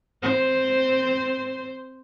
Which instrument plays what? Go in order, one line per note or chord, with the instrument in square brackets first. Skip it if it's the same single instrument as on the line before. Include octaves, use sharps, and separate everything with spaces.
[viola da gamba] C4 C5